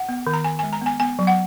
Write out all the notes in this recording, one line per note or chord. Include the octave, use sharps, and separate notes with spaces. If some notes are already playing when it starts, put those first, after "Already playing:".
Already playing: F#5
B3
D#3
A#5
D#3 G#5
G#3 G#5
A#5
B3 G#5
B3 G#5
F#3
F#5